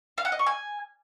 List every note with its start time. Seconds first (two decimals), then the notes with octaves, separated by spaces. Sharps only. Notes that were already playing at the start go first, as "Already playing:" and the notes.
0.18 F5
0.25 F#5
0.32 D#5
0.39 C#6
0.46 G#5